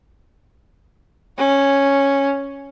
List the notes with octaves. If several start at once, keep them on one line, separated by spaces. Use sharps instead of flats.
C#4